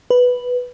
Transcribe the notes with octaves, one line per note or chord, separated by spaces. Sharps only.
B4